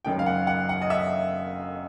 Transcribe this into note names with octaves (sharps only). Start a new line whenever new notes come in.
F#1 F#2 D#3 G5
F5
F#5
F#5
F#5
D#5
E5